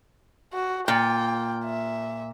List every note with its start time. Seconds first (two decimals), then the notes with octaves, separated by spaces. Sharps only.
0.53 F#4
0.88 A#2 G5
1.65 E5